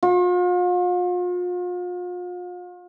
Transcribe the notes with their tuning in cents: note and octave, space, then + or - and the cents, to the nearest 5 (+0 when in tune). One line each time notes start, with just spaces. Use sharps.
F4 +40